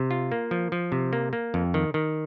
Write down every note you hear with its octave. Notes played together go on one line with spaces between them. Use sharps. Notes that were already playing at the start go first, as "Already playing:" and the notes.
Already playing: C3
F4
A#3
F3
F3
C3
A#3
A#3
F2
D#3
D#3